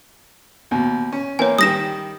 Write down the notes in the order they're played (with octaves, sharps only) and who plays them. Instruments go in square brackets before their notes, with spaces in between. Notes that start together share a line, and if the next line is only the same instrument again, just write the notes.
[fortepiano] D#2 B2
C#4
[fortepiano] E3 A#3 C4 [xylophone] C#5 G#5
[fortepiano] D#3 G3 [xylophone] D#6 A#6 E7